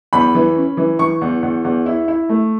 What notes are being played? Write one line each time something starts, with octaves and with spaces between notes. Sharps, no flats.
E2 B5
E3
C#4
E3
E3 C#6
E2
E2
E2
E4
E4
A3